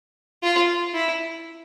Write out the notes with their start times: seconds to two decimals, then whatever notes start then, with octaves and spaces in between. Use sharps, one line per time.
0.43 F4
0.94 E4